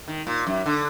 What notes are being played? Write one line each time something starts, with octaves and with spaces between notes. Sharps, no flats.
D#3
A#2
F#2
D3